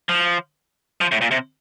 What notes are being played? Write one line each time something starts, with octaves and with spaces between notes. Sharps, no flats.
F3
F3
A2
A#2
C3